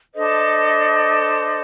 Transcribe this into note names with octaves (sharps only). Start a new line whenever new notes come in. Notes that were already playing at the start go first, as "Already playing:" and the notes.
D4 A4 C5 D#5